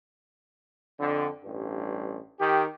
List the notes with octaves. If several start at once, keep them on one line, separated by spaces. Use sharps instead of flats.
F2 D3
A1 G2
D#3 G4